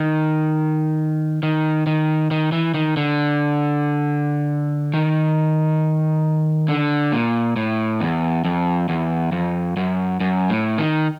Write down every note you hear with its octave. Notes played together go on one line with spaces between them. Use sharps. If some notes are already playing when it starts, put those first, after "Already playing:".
Already playing: D#3
D#3
D#3
D#3
E3
D#3
D3
D#3
D3
A#2
A2
E2
F2
E2
F2
F#2
F#2
A2
D#3